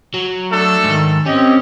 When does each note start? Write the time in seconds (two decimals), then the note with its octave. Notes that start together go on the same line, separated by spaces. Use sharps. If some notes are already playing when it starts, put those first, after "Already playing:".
0.14 F#3
0.51 A3 D4 A4
0.84 G#2 D#3
1.26 C4 C#4 G4 D#5